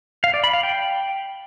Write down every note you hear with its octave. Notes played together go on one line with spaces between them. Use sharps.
F5
D5
B5
F5
G5